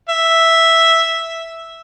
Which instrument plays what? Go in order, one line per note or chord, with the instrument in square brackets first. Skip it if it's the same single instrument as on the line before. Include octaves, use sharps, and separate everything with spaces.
[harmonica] E5